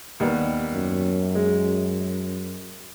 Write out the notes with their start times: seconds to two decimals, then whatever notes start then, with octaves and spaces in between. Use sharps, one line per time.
0.20 D#2 G3 B3
0.74 F#2
1.35 G#3